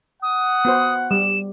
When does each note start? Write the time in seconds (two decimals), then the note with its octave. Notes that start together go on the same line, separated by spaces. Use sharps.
0.22 F#5 D#6
0.65 B3 F#4 C5
1.11 G3 E7